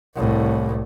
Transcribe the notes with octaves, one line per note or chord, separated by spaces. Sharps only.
C2 A2